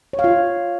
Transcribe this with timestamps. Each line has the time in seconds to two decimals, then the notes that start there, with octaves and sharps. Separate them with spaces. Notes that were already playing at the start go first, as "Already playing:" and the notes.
0.13 C#5
0.19 F5
0.24 F4